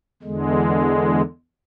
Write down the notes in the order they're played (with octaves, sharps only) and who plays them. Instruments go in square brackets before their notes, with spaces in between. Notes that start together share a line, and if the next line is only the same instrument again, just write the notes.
[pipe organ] E2 D3 G#3